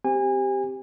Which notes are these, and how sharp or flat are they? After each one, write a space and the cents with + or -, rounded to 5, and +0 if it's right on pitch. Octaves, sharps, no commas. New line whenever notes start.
C4 +0 G4 +0 G#5 -30